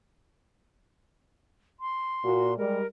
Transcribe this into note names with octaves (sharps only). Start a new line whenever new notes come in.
C6
A#2 F#4
G3 G#3 A#4